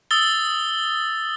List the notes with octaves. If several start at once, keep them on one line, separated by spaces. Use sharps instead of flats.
D#6 E6 A6 G7